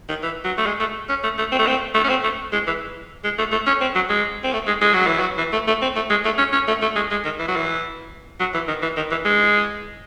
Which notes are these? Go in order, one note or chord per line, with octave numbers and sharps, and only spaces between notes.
D#3
E3
F#3
A3
G#3
A3
C#4
A3
A3
C4
A3
C4
A3
C#4
C4
A3
G#3
E3
G#3
A3
A3
C#4
C4
F#3
G#3
C4
A3
G#3
G#3
F#3
E3
F#3
E3
A3
A3
C4
A3
G#3
A3
C#4
C#4
A3
A3
G#3
G#3
D#3
E3
F#3
E3
F#3
E3
D#3
E3
D#3
E3
G#3